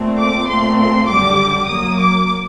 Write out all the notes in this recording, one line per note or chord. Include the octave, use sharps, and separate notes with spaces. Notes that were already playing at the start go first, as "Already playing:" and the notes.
Already playing: A#2 A3 C4
D6
A#2 A3 C4 C6
C6
F#2 D3 G3 D6
F#2 F#3 A#3 D#6
D6